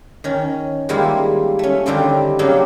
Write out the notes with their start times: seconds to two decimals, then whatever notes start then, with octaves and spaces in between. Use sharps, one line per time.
0.24 D#3 C#4
0.89 D#3 G3 G#3 A#3 E4 F4
1.59 A3 C#4
1.86 D3 D#3 G3 C4 F4 D5
2.39 C#3 F#3 A#3 C4 D4